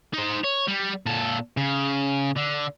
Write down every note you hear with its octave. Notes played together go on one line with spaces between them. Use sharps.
D#4 C5
C#5
G3
A#2 A4
C#3
D3